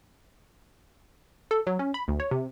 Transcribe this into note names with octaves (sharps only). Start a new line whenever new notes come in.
A4
F#3
C#4
B5
D2
C#5
C3